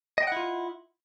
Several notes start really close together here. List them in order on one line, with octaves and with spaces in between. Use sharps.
D#5 G5 F#5 E4 F4